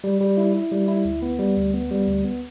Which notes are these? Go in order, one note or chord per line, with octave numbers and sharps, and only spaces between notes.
G3
G3
E4
E4
G3
E4
D2
B3
G3
D2
B3
G3
D2
B3